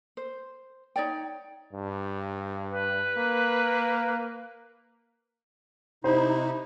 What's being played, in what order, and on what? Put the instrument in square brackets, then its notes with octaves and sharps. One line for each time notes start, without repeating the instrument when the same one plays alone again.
[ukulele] C5
D#4 C#5 D5 G5
[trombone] G2
[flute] B4
[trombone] A#3
[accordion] C3 D#4 [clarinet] E4 [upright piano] C5